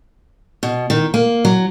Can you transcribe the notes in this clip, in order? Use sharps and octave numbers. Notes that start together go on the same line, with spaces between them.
B2
D#3
A#3
F#3